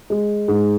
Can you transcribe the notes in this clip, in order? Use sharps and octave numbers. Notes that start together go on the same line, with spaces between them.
G#3
G#2